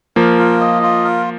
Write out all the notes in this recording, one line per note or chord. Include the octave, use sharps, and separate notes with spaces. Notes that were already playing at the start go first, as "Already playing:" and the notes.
F3 A#3 A#4
F4
D#5
F4
A#4